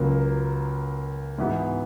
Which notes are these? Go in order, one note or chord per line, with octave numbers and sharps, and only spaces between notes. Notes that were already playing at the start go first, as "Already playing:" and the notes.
Already playing: C#2 C#3 F#3 A#3
G#2 E3 B3 F#4